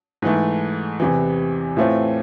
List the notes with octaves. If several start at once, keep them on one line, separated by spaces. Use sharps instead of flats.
G#2 E3 A3
E2 C3 E3
A2 E3 A3 C4 F4